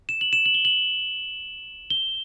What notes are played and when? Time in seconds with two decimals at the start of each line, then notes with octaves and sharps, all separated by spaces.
0.09 E7
0.21 F#7
0.33 E7
0.46 F#7
0.54 G7
0.65 F#7
1.90 G7